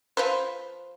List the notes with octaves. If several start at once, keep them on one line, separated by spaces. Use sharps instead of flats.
F3 B4 C5